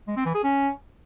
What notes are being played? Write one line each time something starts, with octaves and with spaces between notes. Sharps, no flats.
G#3
C4
E3
G#4
C#4